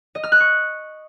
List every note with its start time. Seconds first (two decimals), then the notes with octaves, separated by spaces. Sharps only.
0.15 D#5
0.23 F6
0.32 F#6
0.40 C#6